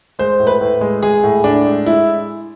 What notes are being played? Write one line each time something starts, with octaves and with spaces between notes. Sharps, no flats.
G#3 C5
A2
B4
A2
G#3
G#3 G#4
A2
A2 D4
G#3
G#3 E4